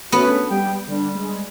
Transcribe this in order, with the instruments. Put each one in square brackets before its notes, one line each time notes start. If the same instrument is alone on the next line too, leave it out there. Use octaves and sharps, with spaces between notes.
[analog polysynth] A3 C#4 B4 [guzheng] B3 [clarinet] F#4
[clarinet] D4
[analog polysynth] G3 [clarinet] G5
[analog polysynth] D3 D4 [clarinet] G3
[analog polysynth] G#3